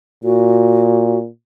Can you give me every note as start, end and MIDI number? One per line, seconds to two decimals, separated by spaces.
0.24 1.28 46
0.24 1.19 66